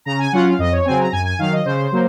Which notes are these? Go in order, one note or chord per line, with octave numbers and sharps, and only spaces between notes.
C#3 A#5
G#5
F#3 C#4 F4 F#5
F5
F2 D#5
C#5
C#3 F#3 C4 G#5
A#5
F#2 G#5
G#5
D#3 F#3 F5
D#5
C#3 C5
F#3 A#3